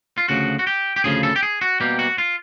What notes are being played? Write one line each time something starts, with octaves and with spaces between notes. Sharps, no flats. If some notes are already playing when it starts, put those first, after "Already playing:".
F4
D2 C#3 F3 F#4
F#4
G4
G4
D2 C#3 F3 G#4
A4
G4
G#4
F#4
B2 G3 A#3 G4
F#4
F4